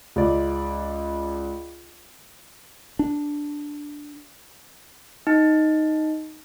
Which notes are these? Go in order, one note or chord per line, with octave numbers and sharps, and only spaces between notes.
C#2 D5
D4
D#4